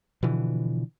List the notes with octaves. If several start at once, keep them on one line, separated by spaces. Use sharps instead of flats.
B2 D3 E3 F3